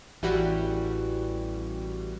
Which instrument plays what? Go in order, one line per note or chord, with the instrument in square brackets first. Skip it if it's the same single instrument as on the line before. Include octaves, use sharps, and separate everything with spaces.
[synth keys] A1 E3 G3 F#4